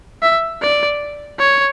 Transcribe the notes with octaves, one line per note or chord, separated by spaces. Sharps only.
E5
D5
C#5